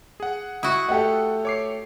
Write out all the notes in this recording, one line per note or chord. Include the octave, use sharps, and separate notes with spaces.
G#4 F#5
E4 F#4 D#6
A3 G4 A4 F#5
C#5 D6 C7